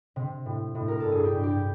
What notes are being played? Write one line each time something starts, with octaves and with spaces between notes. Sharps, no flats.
C3
A2
A2
A#4
G2 A4
G#4
G4
G2
G4